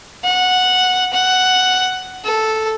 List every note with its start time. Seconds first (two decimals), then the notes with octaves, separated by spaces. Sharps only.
0.24 F#5
1.12 F#5
2.24 A4